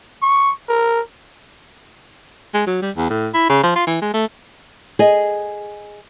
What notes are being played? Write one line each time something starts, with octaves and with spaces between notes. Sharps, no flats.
C#6
A#4
G#3
F#3
G3
E2
A2
E4
C#3
F3
F4
E3
G#3
A3
G#4 D#5